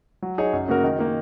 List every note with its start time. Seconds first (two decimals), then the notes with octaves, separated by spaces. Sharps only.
0.22 F#3
0.38 D#4 G#4 C#5
0.53 F#2
0.68 C#3 A#3 F#4 A#4
0.84 D#3
0.99 A#3 D#4